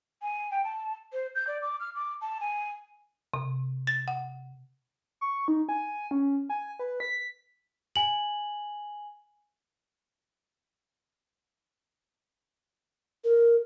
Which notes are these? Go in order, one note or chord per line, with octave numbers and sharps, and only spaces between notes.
G#5
G5
A5
C5
G6
D5
D6
F6
D6
A5
G#5
C3
A6
F#5
C#6
D#4
G#5
C#4
G#5
B4
B6
G#5 F#7
A#4